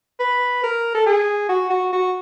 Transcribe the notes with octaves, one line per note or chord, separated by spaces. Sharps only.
B4
A#4
A4
G#4
F#4
F#4
F#4